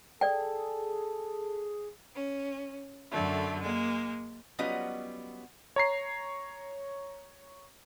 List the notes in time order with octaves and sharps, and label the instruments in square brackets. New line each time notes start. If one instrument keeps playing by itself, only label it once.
[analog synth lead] G#4 [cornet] A4 [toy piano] D5 G5
[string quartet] C#4
F#2 D3 A3
G#3 A#3
[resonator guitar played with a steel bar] F#3 G3 B3 C#4 F4 D#5
[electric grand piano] C#5 A#5 C7